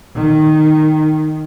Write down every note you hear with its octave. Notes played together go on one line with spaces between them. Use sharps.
D#3